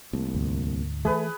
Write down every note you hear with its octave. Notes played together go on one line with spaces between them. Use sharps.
C2 A3 A#3
D2 G#2 D3
E3 A3 G#4 B4